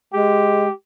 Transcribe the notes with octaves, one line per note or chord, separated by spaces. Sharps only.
G#3 G4 G#4